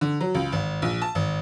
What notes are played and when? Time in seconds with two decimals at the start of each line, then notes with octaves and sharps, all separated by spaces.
0.01 D3
0.20 F#3
0.35 C#2
0.52 G#1
0.82 A#1
1.02 A5
1.15 G#1